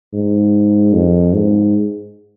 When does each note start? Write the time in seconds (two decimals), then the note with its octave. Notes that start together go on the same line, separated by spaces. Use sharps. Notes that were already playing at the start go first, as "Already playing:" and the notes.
0.13 G#2
0.94 F2
1.34 G#2